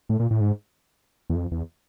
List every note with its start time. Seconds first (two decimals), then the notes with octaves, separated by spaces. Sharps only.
0.09 A2
0.20 A#2
0.31 A2
0.41 G#2
1.30 E2
1.35 F2
1.52 E2